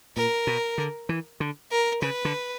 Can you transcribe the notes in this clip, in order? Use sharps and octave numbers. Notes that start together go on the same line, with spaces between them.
A#2 A#4
B2
D3
E3
D3
A#4
C#3 B4
D3